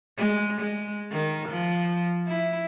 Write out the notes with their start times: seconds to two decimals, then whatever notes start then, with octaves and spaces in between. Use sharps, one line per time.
0.18 G#3
0.61 G#3
1.12 D#3
1.49 F3
2.28 E4